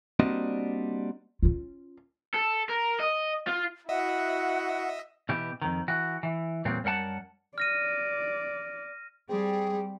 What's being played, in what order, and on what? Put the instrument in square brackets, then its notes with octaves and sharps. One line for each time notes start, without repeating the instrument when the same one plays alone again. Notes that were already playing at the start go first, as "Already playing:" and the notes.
[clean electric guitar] G3 A#3 C4 D4 F#4 D#5
[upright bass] C#4 F4
[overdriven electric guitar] A4
A#4
D#5
F4
[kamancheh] E4 F#4 [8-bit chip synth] D#5 E5 [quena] F#5
[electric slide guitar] B2 E3 G4
F2 D#3
E3 F#4
E3
E2 A#2 F#3 G3 C4
F#2 G3 A#4 F#5 A5
[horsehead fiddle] D5 [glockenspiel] F6 A#6 D#7
[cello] G3 [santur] C4 [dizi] G#4